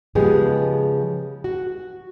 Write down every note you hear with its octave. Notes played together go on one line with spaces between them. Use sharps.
C#3 F3 G#3 B3 G4 G#4
F#4